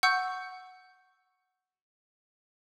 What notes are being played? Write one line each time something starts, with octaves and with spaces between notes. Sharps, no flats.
F#5 C#6 E6 G6